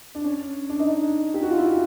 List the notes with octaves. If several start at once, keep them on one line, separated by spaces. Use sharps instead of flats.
D4
C#4
D4
D#4
D4
G4
F#4
F4
E4